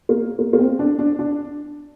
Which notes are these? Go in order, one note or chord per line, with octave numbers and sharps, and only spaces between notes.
A#3
A#3
A#3
C4
D4
D4
D4